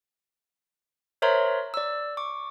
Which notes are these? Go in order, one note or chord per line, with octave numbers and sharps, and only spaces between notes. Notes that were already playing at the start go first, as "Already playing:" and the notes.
A#4 C5 C#5 E5 A#5 C6
D5 E6
C#6 D6